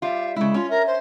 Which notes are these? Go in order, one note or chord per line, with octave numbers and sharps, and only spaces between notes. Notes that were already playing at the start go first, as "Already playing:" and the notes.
G3 F4 E5
C#3 G#3 E4
C#4 F4
A#4 E5
C5